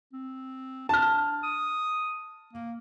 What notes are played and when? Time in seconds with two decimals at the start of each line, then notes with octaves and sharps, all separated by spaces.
0.13 C4
0.89 D4 A5 F6
1.43 D#6
2.53 A#3